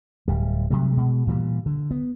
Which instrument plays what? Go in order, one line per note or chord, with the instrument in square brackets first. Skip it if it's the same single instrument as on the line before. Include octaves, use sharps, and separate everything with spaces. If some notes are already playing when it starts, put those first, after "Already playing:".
[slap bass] D1 G3
C3 F#3 G3 A3
B2 G#3
A#2 E3 F3 G3
D3
B3